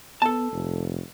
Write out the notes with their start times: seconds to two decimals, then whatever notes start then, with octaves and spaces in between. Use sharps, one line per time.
0.22 B3 A4 A5
0.52 F1